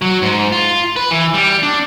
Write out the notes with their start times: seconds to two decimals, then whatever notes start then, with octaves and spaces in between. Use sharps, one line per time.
0.02 F#3
0.22 G#2
0.52 F4
0.96 B4
1.11 E3
1.34 G3
1.63 D4